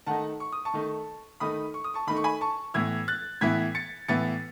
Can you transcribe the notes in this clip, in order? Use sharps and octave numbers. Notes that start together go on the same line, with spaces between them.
D#3 A3 D#4 F#5 A5
C#6
D#6
A5 C#6
D#3 A3 D#4
D#3 A3 D#4 B5 D#6
C#6
D#6
A5 C#6
D#3 A3 D#4 B5
C#6
G#5 B5
A5 C#6
A2 E3 B3 E4 E6 G#6
F#6 A6
A2 E3 B3 E4 G#6 B6
A6 C#7
A2 E3 B3 E4 A6 C#7